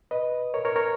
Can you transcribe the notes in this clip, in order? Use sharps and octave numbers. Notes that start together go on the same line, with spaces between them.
B4 D#5
A#4 C#5
A#4 C#5
A#4 C#5